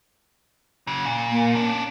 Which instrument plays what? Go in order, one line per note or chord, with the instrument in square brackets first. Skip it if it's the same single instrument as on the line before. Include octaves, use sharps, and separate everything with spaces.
[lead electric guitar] C#3 F#3
A#2
[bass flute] A#3
[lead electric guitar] C#4 D4